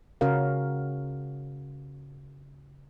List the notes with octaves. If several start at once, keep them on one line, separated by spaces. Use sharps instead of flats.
C#3 C#4 F#4 A#4 F5